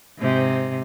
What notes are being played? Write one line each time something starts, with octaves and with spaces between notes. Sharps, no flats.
G#2 C3